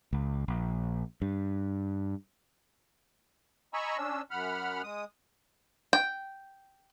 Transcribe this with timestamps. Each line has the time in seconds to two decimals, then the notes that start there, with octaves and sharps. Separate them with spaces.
0.13 C#2
0.48 A#1
1.22 G2
3.74 D#5 G#5 A#5 B5 C#6 E6
3.97 C#4 D4 E6
4.31 F#2 F#5 B5 F6
4.83 G#3 D#6
5.93 G5